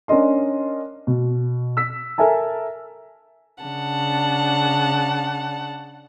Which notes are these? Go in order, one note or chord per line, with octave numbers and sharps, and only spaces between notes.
C#4 D4 A#4 D#5 C6
B2
E6 B6
A4 A#4 E5 G#5 A5
C#3 D4 F#5 A5